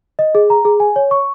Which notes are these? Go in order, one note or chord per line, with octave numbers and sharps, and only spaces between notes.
D#5
G#4
A#5
G#4
G#5
C#5
C#6